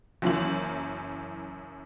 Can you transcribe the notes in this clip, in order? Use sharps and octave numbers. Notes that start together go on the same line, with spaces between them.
F#1 F#2 E3 A#3 F#7